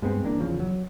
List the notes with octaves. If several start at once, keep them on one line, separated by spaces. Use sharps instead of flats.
G2 G#3 B3 C4
G1 E3 A#3 D4
E2 C#3 F3
F#3